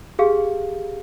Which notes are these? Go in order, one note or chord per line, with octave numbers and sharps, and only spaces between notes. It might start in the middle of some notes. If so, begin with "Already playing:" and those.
G4 G#4 F5